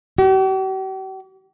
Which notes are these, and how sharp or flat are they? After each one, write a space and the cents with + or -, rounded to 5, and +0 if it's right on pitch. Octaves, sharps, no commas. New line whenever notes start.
G4 -45